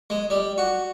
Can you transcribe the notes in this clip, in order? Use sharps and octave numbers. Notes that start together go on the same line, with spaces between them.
G#3
G3
F#4